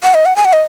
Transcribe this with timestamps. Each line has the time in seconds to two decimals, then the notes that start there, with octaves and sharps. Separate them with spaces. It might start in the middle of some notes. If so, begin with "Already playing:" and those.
0.03 F#5
0.14 D#5
0.25 F#5
0.36 G#5
0.45 F#5
0.53 D#5